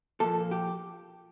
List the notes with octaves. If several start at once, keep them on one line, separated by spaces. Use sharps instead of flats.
A#2 F3 A#3 A4
G4